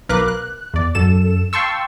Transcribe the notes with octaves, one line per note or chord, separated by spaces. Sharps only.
B1 A#4 B4 F5 D6 F#6
F#6
E2 D5
F#2 A4 E7
F5 G5 A5 C6 C#6 E6